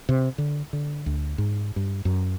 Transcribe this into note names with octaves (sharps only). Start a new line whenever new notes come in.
C3
D3
D3
D2
G#2
G2
F#2